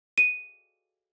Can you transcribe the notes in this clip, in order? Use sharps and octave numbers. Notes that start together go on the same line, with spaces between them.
D#7